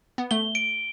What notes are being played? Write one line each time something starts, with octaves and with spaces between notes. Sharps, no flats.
B3
A3 G7
D7